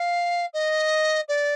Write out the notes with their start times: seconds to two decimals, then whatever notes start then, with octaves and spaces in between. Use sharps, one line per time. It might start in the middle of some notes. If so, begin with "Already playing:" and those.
Already playing: F5
0.53 D#5
1.28 D5